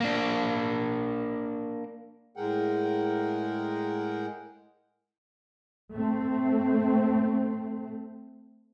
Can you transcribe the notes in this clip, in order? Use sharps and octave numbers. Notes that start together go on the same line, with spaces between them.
A#3 D4
A2 G#3 G#4 A#4 F#5 G5
A3 C4